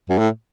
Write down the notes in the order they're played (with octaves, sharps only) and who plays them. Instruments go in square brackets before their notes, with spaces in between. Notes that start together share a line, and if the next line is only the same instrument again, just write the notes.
[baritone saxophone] F#2
A2